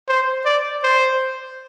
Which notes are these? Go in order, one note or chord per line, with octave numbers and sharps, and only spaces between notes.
C5
D5
C5